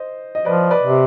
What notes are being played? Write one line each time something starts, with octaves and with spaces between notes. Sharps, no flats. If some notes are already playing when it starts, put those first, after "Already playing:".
Already playing: C5 D#5
D#5
F3 B4 D5
B4 D5
C3